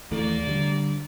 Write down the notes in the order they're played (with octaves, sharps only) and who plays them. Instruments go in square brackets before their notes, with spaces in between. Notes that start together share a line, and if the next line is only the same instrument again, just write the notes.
[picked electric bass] D#2 E3 A3 [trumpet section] A#3 D5
[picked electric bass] D3 G3